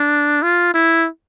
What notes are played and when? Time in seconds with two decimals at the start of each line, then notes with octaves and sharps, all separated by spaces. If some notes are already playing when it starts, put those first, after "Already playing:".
Already playing: D4
0.42 F4
0.74 E4